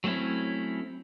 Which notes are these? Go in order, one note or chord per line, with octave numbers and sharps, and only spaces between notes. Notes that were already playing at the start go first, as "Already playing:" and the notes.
F#3 A3 C4 C#4 E4